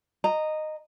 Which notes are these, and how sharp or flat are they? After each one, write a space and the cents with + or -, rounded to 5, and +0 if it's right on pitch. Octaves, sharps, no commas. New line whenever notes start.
D#5 -10 A#5 -10